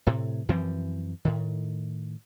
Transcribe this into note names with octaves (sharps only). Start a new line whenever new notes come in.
A2 C3
F#2 E3 F3 C4
A2 D#3